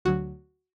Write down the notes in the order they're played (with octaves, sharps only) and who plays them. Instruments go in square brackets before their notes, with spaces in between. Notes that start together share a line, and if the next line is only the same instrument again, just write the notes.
[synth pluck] D2 D3 F#3 F#4